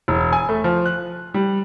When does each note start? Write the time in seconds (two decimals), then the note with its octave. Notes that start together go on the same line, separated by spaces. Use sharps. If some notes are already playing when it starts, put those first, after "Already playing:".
0.08 E1
0.33 G#5
0.49 A3
0.64 F3
0.86 F#6
1.34 G3